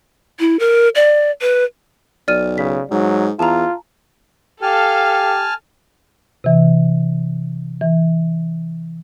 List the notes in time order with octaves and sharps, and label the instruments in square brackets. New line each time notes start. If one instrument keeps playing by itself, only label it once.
[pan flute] E4
A#4
D5
B4
[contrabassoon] B1 [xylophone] D5 F6 D#7
[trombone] C#3 [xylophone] B6
[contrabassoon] G#2 [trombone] F#3
[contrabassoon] E2 [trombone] F4 [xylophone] A5 A#5
[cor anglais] G4 [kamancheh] A4 F5 [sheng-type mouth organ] G#5 A5 F6
[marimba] C3 E3
E3